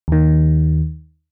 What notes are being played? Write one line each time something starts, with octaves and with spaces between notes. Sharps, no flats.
D#2 D#3